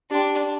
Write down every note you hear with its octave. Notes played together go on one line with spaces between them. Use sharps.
D4 G4 D5 G5 C6